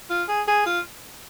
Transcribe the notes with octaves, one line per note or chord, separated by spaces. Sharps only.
F4
G#4
G#4
F4